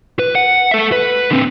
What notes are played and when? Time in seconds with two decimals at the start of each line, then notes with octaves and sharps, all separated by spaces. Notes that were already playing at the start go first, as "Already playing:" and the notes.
0.19 B4
0.35 F#5
0.71 A4 E5
0.92 B4
1.30 D3 C4